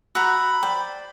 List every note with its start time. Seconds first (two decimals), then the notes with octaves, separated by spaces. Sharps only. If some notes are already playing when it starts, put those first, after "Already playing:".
0.15 F#4 A#5 B5 E6 F#6
0.63 C5 D5 G5